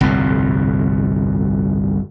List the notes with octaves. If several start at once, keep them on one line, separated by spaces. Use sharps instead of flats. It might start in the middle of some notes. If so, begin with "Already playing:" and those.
G1 C2 F2 A2